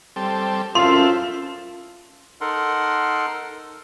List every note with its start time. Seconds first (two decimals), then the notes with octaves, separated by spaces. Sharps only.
0.16 G3 C4 A4
0.75 F#2 C4 E4 F4 A4 F5 C6
2.41 D#4 A4 A#4 F#5 C6